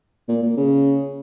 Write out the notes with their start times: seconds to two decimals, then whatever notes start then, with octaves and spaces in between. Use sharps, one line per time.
0.29 A#2
0.43 A#2
0.57 C#3